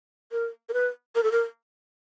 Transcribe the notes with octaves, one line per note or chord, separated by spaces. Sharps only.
A#4
A#4
B4
A#4
A4
A#4